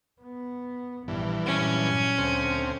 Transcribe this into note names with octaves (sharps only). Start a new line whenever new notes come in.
B3
A#1 G2 E3
A#2 F#3 C#4
D2 C4